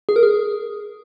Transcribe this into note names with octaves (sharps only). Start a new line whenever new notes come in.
G#4
A#4
G#4